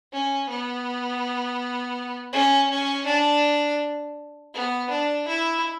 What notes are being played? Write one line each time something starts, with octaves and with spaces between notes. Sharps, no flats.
C#4
B3
C#4
C#4
D4
B3
D4
E4